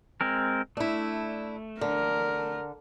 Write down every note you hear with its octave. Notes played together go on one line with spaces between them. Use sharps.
G#3 C4 A#4
A3 D4 E4
D3 A#4